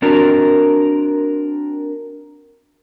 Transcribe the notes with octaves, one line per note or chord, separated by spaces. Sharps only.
C4 D4 F#4 A#4